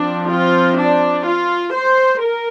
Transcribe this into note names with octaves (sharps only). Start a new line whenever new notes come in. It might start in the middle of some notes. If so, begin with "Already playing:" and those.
Already playing: F3 C4 D4
F4
D4
F4
C5
A#4